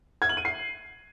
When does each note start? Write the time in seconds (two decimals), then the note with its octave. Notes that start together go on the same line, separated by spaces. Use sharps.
0.22 G#6
0.29 F#7
0.37 D#7
0.45 C7